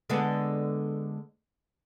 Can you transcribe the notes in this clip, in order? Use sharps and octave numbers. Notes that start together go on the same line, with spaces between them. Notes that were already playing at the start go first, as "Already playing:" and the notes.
D3 G#3 B3